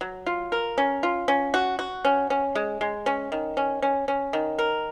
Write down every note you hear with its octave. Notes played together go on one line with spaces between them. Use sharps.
F#3
F4
A#4
C#4
F4
C#4
F#4
F#4
C#4
C#4
G#3
G#3
C#4
D#3
C#4
C#4
C#4
D#3
A#4